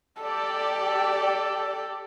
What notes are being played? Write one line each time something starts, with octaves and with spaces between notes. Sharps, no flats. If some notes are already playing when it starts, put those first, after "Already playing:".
G4 A4 D5